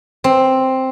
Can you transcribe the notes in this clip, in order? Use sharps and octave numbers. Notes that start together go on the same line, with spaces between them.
C4